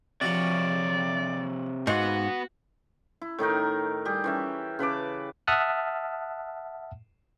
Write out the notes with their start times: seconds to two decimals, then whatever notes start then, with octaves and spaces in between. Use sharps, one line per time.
0.21 C3 F3 D#4 F#4 C#5 D5
1.87 G#2 B3 F#4 F5 F#5
3.22 E4
3.39 A2 D#3 D#4 A#4
4.05 G3 G4 G#4
4.24 E3 C#4 E5
4.79 C#3 B4 A5 D6
5.47 E5 F#5 A5 D#6 F6 F#6